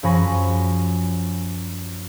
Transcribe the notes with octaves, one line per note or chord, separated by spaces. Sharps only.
F#2 F3 G#5 B5 C#6 A#6